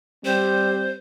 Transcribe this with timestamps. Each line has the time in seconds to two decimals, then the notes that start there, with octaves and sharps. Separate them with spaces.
0.25 G3 C4 C5